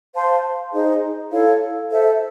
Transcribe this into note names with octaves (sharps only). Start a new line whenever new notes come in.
C5 F5 A5 C6
D#4 G#4 C5 D#5
E4 A4 C#5 F5
A4 C5 E5